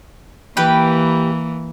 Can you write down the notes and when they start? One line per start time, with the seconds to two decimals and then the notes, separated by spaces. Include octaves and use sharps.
0.57 E3 A#3 G4 B4 G5